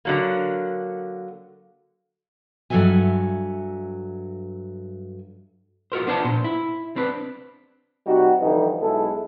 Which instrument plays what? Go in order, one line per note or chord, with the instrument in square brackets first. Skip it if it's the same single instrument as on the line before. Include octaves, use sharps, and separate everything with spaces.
[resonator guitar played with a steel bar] D3 F#3 A#3
[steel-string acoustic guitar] G2 F#3 G#4 A4 E5 G#5
[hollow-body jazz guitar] F4 F#4 A#4 C5
B3 D4 C5 G#5 A5
A#2 C5
E4
C4 D4 B4
[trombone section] C3 G3 D#4 F#4
D3 E3 F3 G3 D#4
B1 G#3 E4 A4